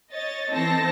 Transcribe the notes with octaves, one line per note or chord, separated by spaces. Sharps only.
C#5 D#5 A6
E3 C4 D#4 A4 A5 A#6